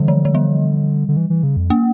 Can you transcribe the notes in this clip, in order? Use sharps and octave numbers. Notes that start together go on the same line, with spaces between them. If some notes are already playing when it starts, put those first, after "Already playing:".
Already playing: D3 E3 G3
F3
F3
G3
D3
E3
E3
C#3
F2
A#3